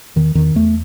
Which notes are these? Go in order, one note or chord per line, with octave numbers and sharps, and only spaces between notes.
E2 D#3
E2 D#3
E2 A3